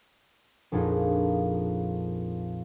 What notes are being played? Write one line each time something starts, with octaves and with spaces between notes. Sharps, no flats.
A#1 F2 A#2 D4 D#4 G#4